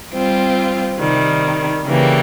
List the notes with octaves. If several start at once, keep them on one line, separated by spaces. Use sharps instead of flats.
G3 C4 F4
C3 D#3 G3
C#3 E3 G3 A#3